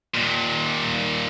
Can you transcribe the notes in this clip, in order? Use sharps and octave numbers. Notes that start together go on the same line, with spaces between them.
D#2 A#2